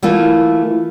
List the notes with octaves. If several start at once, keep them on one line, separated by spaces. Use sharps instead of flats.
E3 A3 A#3 F4